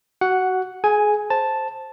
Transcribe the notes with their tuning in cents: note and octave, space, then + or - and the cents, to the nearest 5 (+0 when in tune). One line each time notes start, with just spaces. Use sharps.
F#4 +20 F#5 +0
G#4 +25 G#5 +0
C5 +5 A5 +0